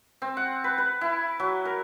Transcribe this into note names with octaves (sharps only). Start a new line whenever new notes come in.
C4
F#5
B4
B4
E4
F#3
A#4